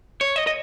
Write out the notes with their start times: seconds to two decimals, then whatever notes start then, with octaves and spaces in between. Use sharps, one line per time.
0.21 C#5
0.36 D#5
0.47 D#5